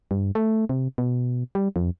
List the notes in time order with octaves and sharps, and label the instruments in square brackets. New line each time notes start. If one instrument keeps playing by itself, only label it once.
[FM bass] G2
A3
C3
B2
G3
F2